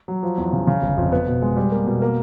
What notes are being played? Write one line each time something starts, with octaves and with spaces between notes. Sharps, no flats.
F#3
F3
E2
C#3
C#3
G1
F2
B3
B2
G#3
G3
A#3
B2
A#3